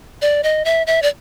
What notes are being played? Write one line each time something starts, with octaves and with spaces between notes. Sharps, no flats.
D5
D#5
E5
E5
D5